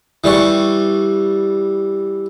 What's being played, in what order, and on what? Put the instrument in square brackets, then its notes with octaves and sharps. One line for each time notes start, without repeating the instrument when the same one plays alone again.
[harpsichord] E3 G3 C#6